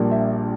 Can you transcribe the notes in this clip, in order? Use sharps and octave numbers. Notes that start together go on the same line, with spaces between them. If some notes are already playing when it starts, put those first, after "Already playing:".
Already playing: A#1 A#2 G3 A#3 D4
E5